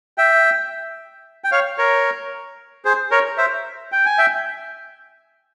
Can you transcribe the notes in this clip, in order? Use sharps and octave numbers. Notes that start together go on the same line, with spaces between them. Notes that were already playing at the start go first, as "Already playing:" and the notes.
E5 G5
G5
C#5 F5
A#4 C#5
G#4 C5
A#4 C#5
C5 E5
G5
G#5
E5 G5